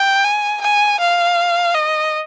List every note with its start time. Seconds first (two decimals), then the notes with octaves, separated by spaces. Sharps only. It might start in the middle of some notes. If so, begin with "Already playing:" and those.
Already playing: G5
0.24 G#5
0.61 G#5
1.00 F5
1.74 D#5